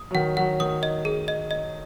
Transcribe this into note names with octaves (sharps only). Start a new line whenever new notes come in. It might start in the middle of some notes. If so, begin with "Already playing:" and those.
Already playing: D#6
F#3
D#3 F#5
F#3 F#5
D#3 D#6
D#5
G#4
D#5
D#5